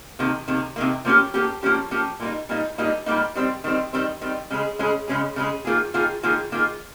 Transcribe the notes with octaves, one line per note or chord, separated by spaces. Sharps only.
C3 D#3 A#3
C3 D#3 A#3
C3 D#3 A#3
F3 A#3 C#4 G4
F3 A#3 C#4 G4
F3 A#3 C#4 G4
F3 A#3 C#4 G4
A#2 G3 A#3 D#4
A#2 G3 A#3 D#4
A#2 G3 A#3 D#4
A#2 G3 A#3 D#4
D#3 G3 C4
D#3 G3 C4
D#3 G3 C4
D#3 G3 C4
C#3 G#3 C#4 G#4
C#3 G#3 C#4 G#4
C#3 G#3 C#4 G#4
C#3 G#3 C#4 G#4
D#3 A#3 F4 G#4
D#3 A#3 F4 G#4
D#3 A#3 F4 G#4
D#3 A#3 F4 G#4